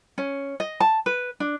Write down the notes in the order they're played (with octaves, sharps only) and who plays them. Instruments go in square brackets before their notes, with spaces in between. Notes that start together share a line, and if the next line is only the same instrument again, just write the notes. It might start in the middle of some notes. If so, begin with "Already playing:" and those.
[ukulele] C#4
D#5
A5
B4
D4